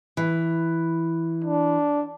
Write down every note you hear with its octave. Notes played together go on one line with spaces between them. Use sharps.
E3
D4